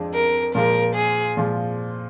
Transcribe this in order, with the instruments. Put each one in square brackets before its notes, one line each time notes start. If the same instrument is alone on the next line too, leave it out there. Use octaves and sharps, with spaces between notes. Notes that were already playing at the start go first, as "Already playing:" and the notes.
Already playing: [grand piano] F2 F3 G#3 D4
[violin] A#4
[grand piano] A#2 F3 G#3 [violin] A#4
[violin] G#4
[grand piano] A#2 F3 G#3